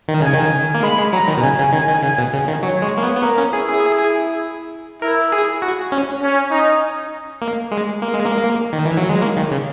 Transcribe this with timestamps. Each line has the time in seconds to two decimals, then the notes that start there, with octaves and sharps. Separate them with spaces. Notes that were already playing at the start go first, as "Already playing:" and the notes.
0.08 D#3
0.21 C#3 G#5
0.34 D#3
0.74 A#3
0.83 G#3 B5
0.98 G#3
1.13 F#3 A#5
1.28 D#3
1.37 B2
1.43 C#3 G#5
1.58 C#3
1.73 D#3
1.88 D#3
2.03 C#3
2.18 B2
2.33 C#3
2.48 D#3
2.62 F#3 C#5
2.82 G#3
2.98 A#3
3.03 B3
3.16 B3
3.22 A#3 A#4
3.38 C#4
3.52 E4 G#4
3.68 G#4
5.02 E4 A#4
5.32 G#4
5.62 F#4
5.92 C#4
6.22 C#4
6.51 D#4
7.42 A#3
7.72 G#3
8.02 A#3
8.14 G#3
8.26 A#3
8.73 D#3
8.85 E3
8.97 F#3
9.09 G#3
9.22 A#3
9.37 D#3
9.51 C#3